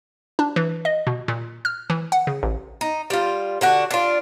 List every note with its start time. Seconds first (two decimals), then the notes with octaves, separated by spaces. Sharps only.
0.39 D4
0.56 E3
0.85 D#5
1.07 B2
1.28 A#2
1.65 F6
1.90 E3
2.12 F#5
2.27 C#3
2.43 A1
2.81 D#4
3.10 G3 F4
3.61 D3 D4 F#4
3.91 D4 F4